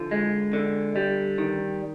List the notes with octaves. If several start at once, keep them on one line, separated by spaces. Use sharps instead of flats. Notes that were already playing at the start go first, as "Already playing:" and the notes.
Already playing: D3 F3 F4
G#3
D3
G3
D#3